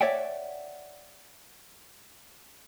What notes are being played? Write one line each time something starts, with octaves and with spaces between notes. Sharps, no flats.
C#5 D5 E5 F#5 G5